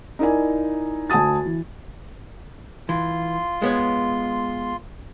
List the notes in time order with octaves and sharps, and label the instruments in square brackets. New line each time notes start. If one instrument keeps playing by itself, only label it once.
[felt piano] D#4 E4 A#4 D5 G#5
D2 G#5 A5 D#6 A6
E3
[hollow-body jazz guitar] E3 [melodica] F4 C6
[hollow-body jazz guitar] G#3 B3 C#5